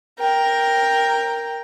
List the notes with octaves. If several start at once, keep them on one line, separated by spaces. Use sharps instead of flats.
A#4 G5